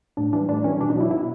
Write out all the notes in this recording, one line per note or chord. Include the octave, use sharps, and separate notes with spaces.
A2 D4
E3 G3 D4
A2 D4
E3 G3 C#4
B2 D4
D#4
F#3 E4
B2 E4